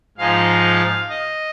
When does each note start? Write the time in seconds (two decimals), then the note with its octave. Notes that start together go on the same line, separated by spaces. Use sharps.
0.18 G#2 F3 G#3 D#4 F5
1.09 D#5